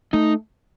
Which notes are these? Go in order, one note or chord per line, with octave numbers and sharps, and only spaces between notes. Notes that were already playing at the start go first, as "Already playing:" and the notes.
A3 D#4